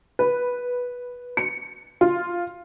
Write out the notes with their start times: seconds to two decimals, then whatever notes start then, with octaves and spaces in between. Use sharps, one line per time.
0.19 B4
1.37 C#7
2.01 F4